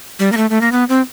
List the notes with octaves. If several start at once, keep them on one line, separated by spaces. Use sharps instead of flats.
G3
A#3
A3
A3
A#3
B3
C4